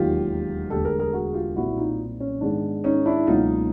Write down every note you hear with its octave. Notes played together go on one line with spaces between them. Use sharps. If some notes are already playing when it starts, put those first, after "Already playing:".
Already playing: E1 D#2 D#3 F#3 F4 G4
E1 D2 D3 G4 A4
G#4 A#4
G#4 A#4
F#4 G#4
F4 G4
B1 A#2 G3 C4 E4 F#4
D#4 F4
C#4
G#2 D#3 G#3 B3 D4
C#4 D#4
D4 E4
C#2 B2 F#3 A#3 C#4 D#4 F4